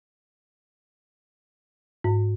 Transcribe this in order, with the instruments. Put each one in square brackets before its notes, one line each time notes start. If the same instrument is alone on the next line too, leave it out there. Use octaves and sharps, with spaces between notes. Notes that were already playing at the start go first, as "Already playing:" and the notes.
[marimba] G#2